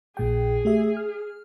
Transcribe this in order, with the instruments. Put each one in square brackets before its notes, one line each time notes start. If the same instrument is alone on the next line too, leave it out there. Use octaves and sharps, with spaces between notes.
[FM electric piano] A#1 A#2 G5 [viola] G#4
[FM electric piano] A3 G4 E5
F6